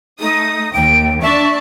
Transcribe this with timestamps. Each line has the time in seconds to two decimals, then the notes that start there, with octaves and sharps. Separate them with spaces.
0.20 A3 D#4 D#6
0.74 D#2 G5 D7
1.22 D4 D5 E5 A5 C#6